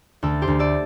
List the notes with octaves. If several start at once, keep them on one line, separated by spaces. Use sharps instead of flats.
D2 A4
G4 C5
D2
A4 D5